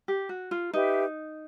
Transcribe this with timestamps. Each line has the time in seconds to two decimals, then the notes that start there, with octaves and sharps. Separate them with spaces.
0.08 G4
0.29 F#4
0.51 F4
0.73 D#4 G4 B4 E5